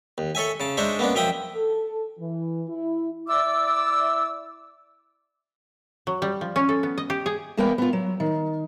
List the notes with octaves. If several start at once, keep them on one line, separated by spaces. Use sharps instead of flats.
D#2
A4 C#5 E5 G#5
C#3 A5
G#3 D4 D#4 C5 C#5 E5
A#3 B3 C#4 D4
F#2 F3 E5 G5 D#6
A4
E3
E4
E4 D5 D6 E6
F#3
G3
F3
C#4
A4
B3
D#5
G4
G#4
E2 G#3 A#3 B3 B4 G5
B3 F4
F#3
D#3